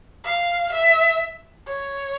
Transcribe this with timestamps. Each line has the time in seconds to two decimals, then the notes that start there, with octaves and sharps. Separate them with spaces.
0.24 F5
0.72 E5
1.67 C#5